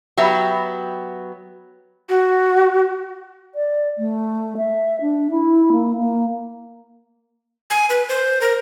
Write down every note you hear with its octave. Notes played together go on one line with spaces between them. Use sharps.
F#3 B3 G4 E5
F#4
D5
A3
E5
D4
E4
A#3
A#3
G#5
B4
C5
A#4